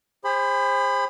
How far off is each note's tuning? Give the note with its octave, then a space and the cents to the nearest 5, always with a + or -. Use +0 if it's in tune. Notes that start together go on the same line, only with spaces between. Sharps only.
G#4 -40 C5 +20 B5 +20